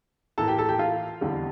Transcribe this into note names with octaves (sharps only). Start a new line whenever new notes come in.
A2 E3 A#3 A4 A5
G4 G5
A4 A5
G4 G5
F4 F5
F1 E2 D3 G3